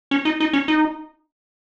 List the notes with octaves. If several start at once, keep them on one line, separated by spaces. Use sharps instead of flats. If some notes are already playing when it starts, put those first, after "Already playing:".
C#4
D#4
D#4
C#4
D#4